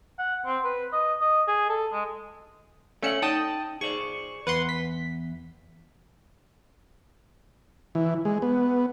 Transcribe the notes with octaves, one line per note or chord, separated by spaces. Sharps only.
F#5
C4
B4
D#5
D#5
G#4
A4
G#3
A3 C#4 D5 E5 F#5 C#7
D#4 G5 A5 D#6
G#4 C5 D5 C#6
E2 B4 F#5 C6
B6
E3
G#3
B3